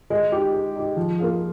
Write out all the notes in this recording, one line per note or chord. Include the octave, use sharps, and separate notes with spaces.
G#3
D#4 G4
G#3
D#4 G4
F3
A#3 F4 G#4